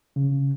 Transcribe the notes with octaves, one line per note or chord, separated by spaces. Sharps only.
C#3